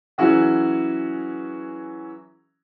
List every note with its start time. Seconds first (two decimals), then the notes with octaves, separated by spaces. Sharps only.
0.18 E3 F#3 C#4 E4 F#4 G#4